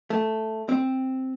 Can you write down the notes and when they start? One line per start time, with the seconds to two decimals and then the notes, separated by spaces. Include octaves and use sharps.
0.10 A3
0.69 C4